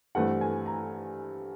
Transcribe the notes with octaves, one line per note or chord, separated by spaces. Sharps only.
G2 E3 A3 C4 F#5
G#5
A#5